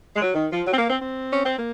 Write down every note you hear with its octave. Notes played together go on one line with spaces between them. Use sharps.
G#3
F#3
D#3
F3
F#3
C4
A#3
C4
C4
C#4
C4
A#3